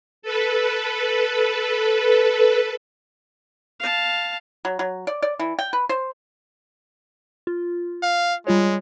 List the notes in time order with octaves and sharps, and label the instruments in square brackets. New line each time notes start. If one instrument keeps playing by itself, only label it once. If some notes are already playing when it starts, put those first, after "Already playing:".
[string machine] A4 B4
[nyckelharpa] F5 A5
[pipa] F#3
F#3
D5
D5
E3
G5
B4
C5
[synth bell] F4
[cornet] F5
[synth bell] G3 F4 C#5 [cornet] G#3